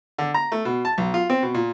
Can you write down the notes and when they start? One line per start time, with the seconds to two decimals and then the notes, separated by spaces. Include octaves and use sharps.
0.18 D3
0.34 A#5
0.52 A3
0.65 B2
0.85 A5
0.98 B1
1.14 F4
1.30 C4
1.43 B2
1.55 A#2